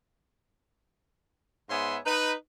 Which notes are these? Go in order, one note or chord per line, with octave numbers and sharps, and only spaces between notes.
G#2 B3 G#4 C#5 E5 C6
D#4 B4